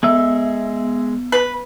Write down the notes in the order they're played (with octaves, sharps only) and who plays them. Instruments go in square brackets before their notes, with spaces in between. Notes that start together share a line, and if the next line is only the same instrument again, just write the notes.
[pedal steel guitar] G#3 E5 [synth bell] B3
[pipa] B4